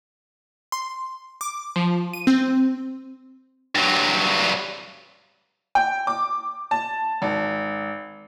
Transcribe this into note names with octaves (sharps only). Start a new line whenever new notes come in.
C6
D6
F3
D#7
C4
G2 F#3
G5
D6
A5
G#1